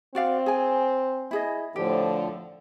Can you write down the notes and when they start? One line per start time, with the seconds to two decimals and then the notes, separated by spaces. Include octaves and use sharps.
0.15 C4 F#4 D5 F5
0.46 G#4 G#5
1.31 E4 G#4 D#5
1.76 A2 D3 F3 G4